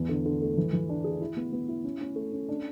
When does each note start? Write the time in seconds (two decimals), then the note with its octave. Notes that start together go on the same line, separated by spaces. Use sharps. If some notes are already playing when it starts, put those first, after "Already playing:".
Already playing: E2 E3
0.09 D3
0.26 D3
0.42 A3
0.58 E3
0.73 E3
0.89 D4
1.04 G#4
1.21 E4
1.37 B3
1.52 B3
1.68 E4
1.84 C#4
2.01 C#4
2.16 A3
2.32 C#4
2.49 D4